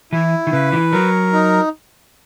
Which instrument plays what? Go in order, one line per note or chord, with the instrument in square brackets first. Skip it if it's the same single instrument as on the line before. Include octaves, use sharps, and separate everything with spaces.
[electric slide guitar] E3 [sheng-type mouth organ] E4
[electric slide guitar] D#3
[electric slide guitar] C#3 [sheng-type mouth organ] B4
[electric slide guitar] E3
[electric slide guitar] F#3 [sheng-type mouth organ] A#4
[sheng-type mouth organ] D#4